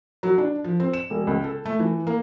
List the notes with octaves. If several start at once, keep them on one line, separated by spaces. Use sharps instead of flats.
F#3
D4
F3
C4
E7
E1
C#2
A4
A3
E3
A#3